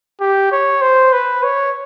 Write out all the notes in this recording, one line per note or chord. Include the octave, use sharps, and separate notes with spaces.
G4
C#5
C5
B4
C#5